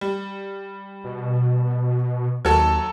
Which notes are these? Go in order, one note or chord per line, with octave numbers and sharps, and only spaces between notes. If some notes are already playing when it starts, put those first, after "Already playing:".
G3
B2
D#2 F#3 A4